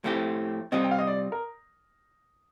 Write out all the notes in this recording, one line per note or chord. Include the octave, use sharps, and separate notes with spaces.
A2 F3 A3 C4 G4
C3 G3 C4 F4 D#5
G5
F5
D#5
D5
A#4